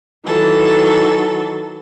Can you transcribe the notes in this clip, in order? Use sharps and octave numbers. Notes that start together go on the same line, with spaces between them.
D#3 E3 F#3 A4